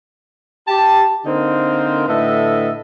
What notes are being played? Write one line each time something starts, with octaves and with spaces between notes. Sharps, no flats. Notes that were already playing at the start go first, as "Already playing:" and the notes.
G4 A5
D3 A#3 C4 D#4 A#4 C5
A2 D3 A4 B4 D#5 E5